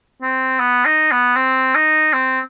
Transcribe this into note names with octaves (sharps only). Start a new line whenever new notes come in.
C4
B3
D#4
B3
C4
D#4
C4